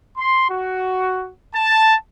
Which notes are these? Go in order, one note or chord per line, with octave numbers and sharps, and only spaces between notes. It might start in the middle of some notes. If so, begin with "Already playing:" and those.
C6
F#4
A5